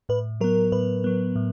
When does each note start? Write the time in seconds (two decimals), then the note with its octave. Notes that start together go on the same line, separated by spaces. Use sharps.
0.09 A2 B4
0.41 F#3 B3 A#4
0.72 A2 B4
1.04 F#3 B3
1.36 A2